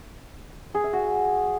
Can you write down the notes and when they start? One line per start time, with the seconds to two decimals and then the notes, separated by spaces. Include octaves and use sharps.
0.75 G#4
0.84 E5
0.93 F#4